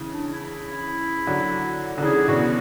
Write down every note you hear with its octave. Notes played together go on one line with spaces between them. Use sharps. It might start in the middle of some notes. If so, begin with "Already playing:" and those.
Already playing: C#3 E3
D4
D4
E4
D3 F#3
D3
C#3 E3 G#4
E3
B2 D3 F#4